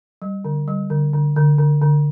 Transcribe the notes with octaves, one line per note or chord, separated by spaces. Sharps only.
G3
D3
G3
D3
D3
D3
D3
D3